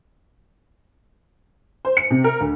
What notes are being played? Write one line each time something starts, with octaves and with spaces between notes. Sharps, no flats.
C5
C#7
C3
A#4
D2